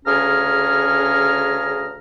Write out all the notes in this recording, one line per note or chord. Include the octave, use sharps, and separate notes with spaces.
D2 C#3 C#4 G#4 A#5 F6